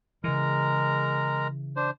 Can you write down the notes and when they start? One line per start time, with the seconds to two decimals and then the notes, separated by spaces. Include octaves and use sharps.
0.24 C#3 E3 G#3 A#4 A#5
1.76 D4 C5